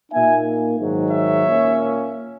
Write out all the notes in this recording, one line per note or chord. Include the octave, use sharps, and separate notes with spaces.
A#2 A#3 D#4 E5 G#5
G#2 D#3 F#3
C#5 E5
A#2 A#3 C#4